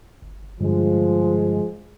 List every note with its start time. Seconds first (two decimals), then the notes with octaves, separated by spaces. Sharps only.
0.22 G1
0.60 G2 D3 F3 G3 G#3